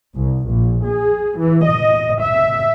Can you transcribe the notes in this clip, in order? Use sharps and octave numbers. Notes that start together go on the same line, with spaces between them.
C2
A#1
G#4
E3
D#5
E5